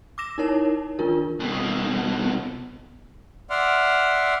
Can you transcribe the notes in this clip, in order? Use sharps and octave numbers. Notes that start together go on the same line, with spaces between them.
D6 E6 A#6 E7
D#4 E4 A#4 C#5 A5
D#3 D4 F4 A#4
C2 B2
D5 E5 F#5 C6 F6